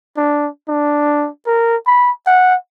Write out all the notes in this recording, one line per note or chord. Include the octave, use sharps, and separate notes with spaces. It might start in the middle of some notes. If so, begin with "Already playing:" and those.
D4
D4
A#4
B5
F#5